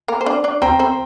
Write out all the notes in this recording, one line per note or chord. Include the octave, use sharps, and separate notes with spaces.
A#3 A#4
C5
D4 D5
D4 D5
C4 C5 G5 A#5
C4 C5